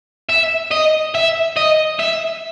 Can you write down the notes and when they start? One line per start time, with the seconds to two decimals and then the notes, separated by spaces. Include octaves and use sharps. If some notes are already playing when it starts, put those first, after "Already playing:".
0.30 E5
0.71 D#5
1.15 E5
1.57 D#5
2.00 E5